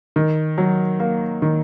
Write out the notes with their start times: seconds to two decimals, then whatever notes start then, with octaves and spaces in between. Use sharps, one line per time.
0.16 D#3
0.58 F#3
1.00 A#3
1.42 D#3